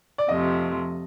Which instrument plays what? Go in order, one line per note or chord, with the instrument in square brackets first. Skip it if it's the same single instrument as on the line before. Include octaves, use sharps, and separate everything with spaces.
[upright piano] D5
[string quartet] F2 C3 F3 A3 [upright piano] D#5